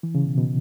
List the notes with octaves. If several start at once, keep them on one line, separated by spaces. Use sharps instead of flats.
E3
C#3
B2
B2